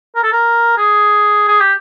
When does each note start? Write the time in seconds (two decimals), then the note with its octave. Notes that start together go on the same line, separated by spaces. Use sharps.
0.15 A#4
0.24 A4
0.32 A#4
0.78 G#4
1.48 G#4
1.61 G4